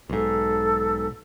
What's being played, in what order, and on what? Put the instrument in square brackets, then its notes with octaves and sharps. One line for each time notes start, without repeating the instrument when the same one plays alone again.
[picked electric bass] B1 G#2 [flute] A4